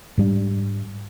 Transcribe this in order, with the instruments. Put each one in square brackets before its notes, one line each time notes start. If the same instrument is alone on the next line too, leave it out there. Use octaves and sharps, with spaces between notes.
[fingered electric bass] G#2 G3 D4